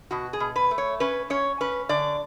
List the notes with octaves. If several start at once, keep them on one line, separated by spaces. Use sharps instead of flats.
B2 F#4
G#4
B2
B4
A3
C#5
C#4 B4
C#4 C#5
C#4 B4
D3 D5